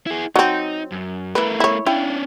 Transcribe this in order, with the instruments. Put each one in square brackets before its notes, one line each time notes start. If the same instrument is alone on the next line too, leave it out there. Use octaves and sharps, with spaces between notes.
[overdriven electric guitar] E4 G#4
[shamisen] F#3 C4 [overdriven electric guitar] D#4
[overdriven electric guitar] F#2
[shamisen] E3 B4 [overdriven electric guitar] A3 A#4
[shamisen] E4 C#5
[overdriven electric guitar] C#4 D4 [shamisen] E4 F5 G5